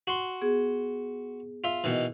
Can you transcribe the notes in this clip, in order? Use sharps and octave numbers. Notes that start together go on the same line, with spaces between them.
F#4 C6
B3 G#4
F4 E5
B2 D#3 E3